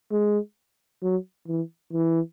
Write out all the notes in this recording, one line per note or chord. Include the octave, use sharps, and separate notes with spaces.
G#3
F#3
E3
E3